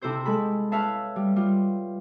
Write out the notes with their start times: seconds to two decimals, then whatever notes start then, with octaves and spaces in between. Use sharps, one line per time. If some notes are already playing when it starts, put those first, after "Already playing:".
0.02 C3 E4 A4 C5 G6
0.26 G#3 A4 B5
0.72 B4 C#5 E5 F5 A5
1.16 G3
1.36 G3 F4